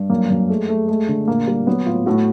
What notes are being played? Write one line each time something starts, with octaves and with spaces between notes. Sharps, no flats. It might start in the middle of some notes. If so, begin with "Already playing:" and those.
Already playing: G2
F#2 A#3
F#2
G#3 A3
G#3 A3
G#3 A3
D3
A#2 A#3
G3
F#3 B3
A2 F4
A2 F#4